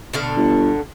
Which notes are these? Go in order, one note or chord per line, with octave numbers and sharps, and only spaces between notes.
B2 D3 F5
G1